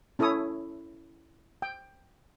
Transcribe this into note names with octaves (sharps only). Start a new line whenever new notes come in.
C#4 E4 A4 C#5 D#6
G5